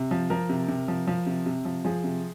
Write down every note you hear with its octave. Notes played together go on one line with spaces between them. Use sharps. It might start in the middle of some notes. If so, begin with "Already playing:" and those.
Already playing: C3
F3
F3 A#4
C3
C3
F3
F3
C3
C3
F3
F3 G#4
C3